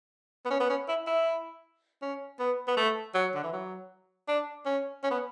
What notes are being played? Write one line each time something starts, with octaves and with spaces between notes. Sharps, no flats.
B3
C#4
B3
C#4
E4
E4
C#4
B3
B3
A3
F#3
D3
E3
F#3
D4
C#4
C#4
B3